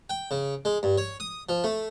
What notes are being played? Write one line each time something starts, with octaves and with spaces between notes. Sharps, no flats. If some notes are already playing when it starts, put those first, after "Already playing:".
G5
C#3
G#3
G2
C#5
D#6
F3
A3